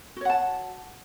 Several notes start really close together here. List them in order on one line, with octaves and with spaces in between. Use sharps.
F#4 C#5 F#5 A5